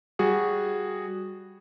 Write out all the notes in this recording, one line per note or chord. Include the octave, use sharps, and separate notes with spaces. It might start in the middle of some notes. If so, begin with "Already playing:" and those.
G3 F#4 G#4